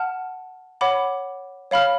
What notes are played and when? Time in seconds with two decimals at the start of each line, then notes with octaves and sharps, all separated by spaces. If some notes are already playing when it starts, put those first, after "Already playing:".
Already playing: F#5 A5 F6
0.81 C#5 F#5 B5 D6
1.71 C#5 F5 B5 F6